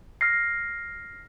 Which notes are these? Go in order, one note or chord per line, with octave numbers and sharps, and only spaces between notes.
F6 A#6 C7